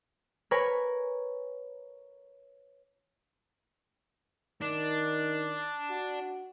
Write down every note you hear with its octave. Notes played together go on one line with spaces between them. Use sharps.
A#4 B4 C#5 G#5 B5
D#3 D4
F#4